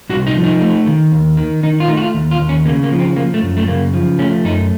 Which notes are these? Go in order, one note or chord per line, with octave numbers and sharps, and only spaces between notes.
C2 F#4
D#4
F3
D#4
A3
D#3
D#2
D#3
D#3 D#4
F4
A3 D#4
F#4
F4
D#2
F4
D#2
C#4
C#3 A#3
A#3
F3
C4
F3 A#3
A3
F#2
A3
C#3 A#3
F3
A3 C#4
F#2 D#4